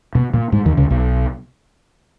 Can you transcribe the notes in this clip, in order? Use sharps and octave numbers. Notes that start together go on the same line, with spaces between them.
B2 B3
A#2 A#3
G#2 G#3
D#2 D#3
C#2 C#3
B1 B2